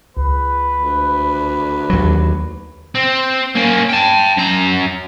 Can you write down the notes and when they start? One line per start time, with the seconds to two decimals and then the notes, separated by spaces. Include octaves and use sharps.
0.17 C#2 B4
0.77 D2
1.90 D#2 F#3
2.95 C4
3.55 A#3 C#4
3.89 G5 A5
4.37 F#2 A#5